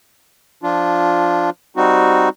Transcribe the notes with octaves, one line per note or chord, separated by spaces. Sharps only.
F3 D4 F4
G3 C4 D#4 F#4